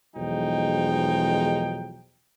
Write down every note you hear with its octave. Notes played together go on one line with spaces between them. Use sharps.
B1 E2 F3 G#3 D#4 G5